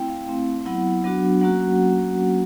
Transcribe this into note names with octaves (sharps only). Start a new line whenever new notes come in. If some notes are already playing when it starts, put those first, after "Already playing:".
Already playing: A3 C4 E4 G5
F5
A3 C4 E4
F#3 B3 E4 F#5
F#3 B3 D4 F#4
F#3 A#3 C#4 F#4 F#5